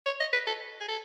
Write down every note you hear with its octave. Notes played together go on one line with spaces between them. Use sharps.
C#5
D#5
B4
A4
G#4
A4